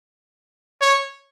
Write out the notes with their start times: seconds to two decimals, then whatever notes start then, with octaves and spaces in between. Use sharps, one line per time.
0.81 C#5